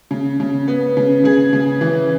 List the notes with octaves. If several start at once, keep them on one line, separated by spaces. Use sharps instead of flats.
C#3
C#3
B3
C#3
C#3 G#4
C#3
E3